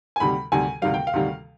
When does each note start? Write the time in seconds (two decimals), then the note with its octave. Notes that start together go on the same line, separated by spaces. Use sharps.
0.16 G#5
0.20 D2 C3 D#3 G3 B5
0.52 D2 C3 D#3 G3 G#5
0.82 D2 C3 D#3 G3 F5
0.94 G5
1.07 F5
1.13 D2 C3 D#3 G3